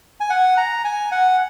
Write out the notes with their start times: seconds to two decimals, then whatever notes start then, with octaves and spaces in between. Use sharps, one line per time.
0.20 G#5
0.30 F#5
0.57 A#5
0.85 G#5
1.12 F#5